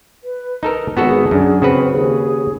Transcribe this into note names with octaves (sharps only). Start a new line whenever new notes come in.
B4
D#4 A4 A#4
G#1 B3 F#4 G#4 A4
F#2 D4
C#3 C4 F#4 B4
D#2 G#4